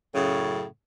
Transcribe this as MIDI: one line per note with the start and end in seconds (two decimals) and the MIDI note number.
0.14 0.64 42
0.14 0.64 45
0.14 0.64 49